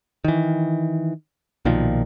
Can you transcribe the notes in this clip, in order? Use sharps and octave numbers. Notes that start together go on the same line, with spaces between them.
D#3 E3
B1 A#2 D#3 F3